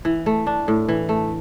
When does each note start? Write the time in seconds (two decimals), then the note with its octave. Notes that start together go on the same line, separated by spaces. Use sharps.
0.05 E3
0.26 A3
0.47 D4
0.68 A2
0.89 E3
1.09 A3